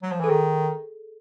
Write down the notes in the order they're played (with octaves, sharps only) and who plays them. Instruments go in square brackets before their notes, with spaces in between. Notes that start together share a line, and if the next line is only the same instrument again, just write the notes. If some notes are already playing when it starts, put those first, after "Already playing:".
[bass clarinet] F#3
F3
[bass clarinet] E3 [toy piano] A4
[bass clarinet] D#3 [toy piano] G#4